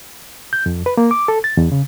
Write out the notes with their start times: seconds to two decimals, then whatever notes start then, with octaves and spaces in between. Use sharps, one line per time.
0.53 G6
0.66 F2
0.86 B4
0.97 A#3
1.11 D6
1.28 A4
1.44 A6
1.57 E2
1.72 C#3